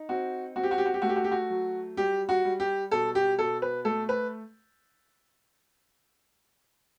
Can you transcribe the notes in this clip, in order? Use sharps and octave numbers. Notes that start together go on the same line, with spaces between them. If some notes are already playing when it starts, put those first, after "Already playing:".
Already playing: D#4
C4 F#4
C4 F#4
G4
F#4
G4
F#4
G4
A3 F#4
G4
F#4
G4
F#4
F#3
G3 G4
F#4
G3
G4
B2 A4
G4
B2 A4
B4
A3 A4
B4